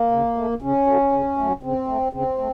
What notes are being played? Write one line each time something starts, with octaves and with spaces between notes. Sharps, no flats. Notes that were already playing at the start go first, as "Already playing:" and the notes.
Already playing: A#3
C#3
A3
C#3 C#4
F#3 A3
C#3
F#3 A3
C#3 C4
A3
C#3 C4
A3